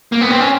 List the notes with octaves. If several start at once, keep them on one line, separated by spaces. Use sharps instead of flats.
A#3
B3
C4
C#4